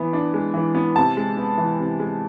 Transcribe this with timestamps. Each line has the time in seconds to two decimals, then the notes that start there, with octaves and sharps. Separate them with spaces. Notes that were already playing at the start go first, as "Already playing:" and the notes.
Already playing: E3 B3
0.13 D4
0.34 G#3
0.54 E3
0.75 B3
0.96 C3 A5
1.17 G#3
1.37 B3
1.58 E3
1.79 C3
2.00 G#3